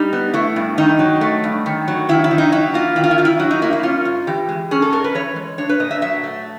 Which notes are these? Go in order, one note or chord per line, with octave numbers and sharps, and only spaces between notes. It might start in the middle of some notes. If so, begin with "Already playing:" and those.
Already playing: G3 D#4
B3
A3 E4
G2
D#3 D#4
F#3
A3
G2
D#3
F#3
D#3 E4
E4
D#3
D#4
F#3 E4
A#3 F4
D#3 E4
F4
E4
D#3 F4
E4
F#3 F#4
D#4
A#3 E4
E4
C#4 F4
G#2
E3 G4
G#3
C#4 G#4
A4
G#2 A#4
B4
E3 C#5
G#3
D4 C#5
B4
A#2 D#5
E5
F#3 E5
A3